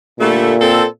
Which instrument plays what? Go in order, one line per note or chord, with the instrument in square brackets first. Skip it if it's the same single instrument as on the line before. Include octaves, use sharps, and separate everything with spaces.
[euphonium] A#2 [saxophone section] D3 G3 A3
[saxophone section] C4 A4